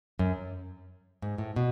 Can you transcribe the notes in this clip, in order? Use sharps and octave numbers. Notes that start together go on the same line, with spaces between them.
F#2
G#2
A2
B2